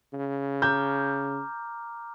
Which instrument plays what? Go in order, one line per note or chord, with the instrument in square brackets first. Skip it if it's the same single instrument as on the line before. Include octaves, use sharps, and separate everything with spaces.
[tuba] C#3
[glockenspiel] A#5 D6 F6 [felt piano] G6